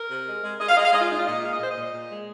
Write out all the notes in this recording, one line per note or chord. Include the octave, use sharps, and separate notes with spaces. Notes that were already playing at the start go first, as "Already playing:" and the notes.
Already playing: A#4
C3
G#3
G#3
G#3 D#5
F5
G#3 D#5
F5
G#3 D#5
F4
A#2 D#4
F4
A#2 D#5
G#3 F5
D#5
A#2 C5
D#5
A#2
A#2
G#3